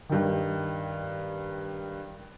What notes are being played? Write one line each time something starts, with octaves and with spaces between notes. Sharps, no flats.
G2 D#3